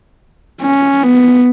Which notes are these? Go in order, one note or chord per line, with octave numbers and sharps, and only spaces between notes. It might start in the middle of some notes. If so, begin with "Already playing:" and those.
C#4
B3